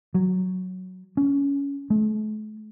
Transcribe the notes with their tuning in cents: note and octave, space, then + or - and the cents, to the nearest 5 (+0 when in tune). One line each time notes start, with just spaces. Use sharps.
F#3 +0
C#4 +20
A3 -45